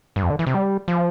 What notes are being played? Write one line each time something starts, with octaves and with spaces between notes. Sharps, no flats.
G2
F2
D3
E3
C3
G3
F3